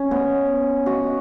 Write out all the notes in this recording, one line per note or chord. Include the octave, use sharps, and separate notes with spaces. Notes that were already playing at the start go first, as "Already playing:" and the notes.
Already playing: C#4
B3
F#4